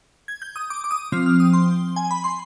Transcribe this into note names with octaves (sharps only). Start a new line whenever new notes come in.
G#6
G6
D#6
D6
D6
D#6
F3 C4 F6
F6
D#6
C6
G#5
B5
C6